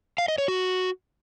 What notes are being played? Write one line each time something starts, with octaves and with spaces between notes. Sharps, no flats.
F5
D#5
C#5
F#4